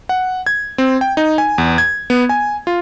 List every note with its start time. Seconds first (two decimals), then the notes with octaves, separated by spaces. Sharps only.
0.09 F#5
0.46 G#6
0.78 C4
1.01 G5
1.17 D#4
1.38 G#5
1.58 E2
1.78 G#6
2.10 B3
2.29 G#5
2.67 F4